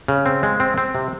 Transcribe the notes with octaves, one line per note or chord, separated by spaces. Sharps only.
C#3
C4
G#3
C4
C4
C3